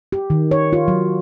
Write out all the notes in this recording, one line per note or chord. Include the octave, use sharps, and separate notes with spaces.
G4
D#3
C#5
F4
F#3